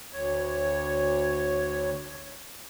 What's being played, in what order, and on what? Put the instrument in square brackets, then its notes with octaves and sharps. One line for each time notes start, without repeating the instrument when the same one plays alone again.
[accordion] D2 C#5